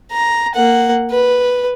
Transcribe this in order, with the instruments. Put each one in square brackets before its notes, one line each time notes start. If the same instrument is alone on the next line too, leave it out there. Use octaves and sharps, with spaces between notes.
[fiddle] A#5
A#3 F#5
B4